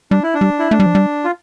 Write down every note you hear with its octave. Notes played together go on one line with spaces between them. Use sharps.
G3 D4
E4
D4
G3
E4
A3 D4
G3
F3
G3
F4